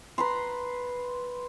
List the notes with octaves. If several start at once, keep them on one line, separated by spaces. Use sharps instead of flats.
B4 A#5 C6